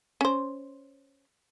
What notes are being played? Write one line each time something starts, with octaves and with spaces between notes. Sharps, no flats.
C#4 C5